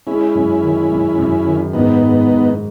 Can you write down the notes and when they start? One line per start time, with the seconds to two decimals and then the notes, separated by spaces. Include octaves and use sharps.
0.07 G#3 C#4 E4
0.35 F#2
0.62 D#3
0.91 F#2
1.18 F#2
1.47 D#3
1.73 G#2 B3 D#4
2.02 G#2
2.30 G#2